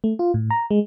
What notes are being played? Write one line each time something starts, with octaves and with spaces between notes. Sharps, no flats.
A3
F4
A2
A#5
G#3